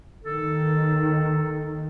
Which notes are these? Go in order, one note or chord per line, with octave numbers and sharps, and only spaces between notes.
D#2 D#3 A4